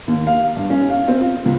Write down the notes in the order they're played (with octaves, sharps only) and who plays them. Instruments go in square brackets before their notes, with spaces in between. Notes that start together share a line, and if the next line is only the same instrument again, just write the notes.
[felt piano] D#2
F5
G2
C#4
F5
C4
F4
C#2